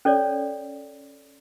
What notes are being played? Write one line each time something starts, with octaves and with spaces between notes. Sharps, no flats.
C#4 A4 C#5 D5